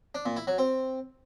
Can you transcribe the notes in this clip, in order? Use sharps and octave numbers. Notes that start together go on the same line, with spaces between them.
D4
A#2
E4
F#3
C4